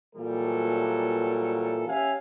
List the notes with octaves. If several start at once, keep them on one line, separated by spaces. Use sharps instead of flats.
A#2 E3 F#3 G3 A4
C#4 G4 E5 F5 G#5